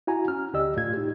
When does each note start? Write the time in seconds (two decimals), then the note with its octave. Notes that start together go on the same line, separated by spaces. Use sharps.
0.07 E4 F#4 G#5 A#5
0.28 C#4 F6
0.53 D2 D3 G4 D5 D#5 E6
0.77 A2 F4 G#6
0.94 D#4 G4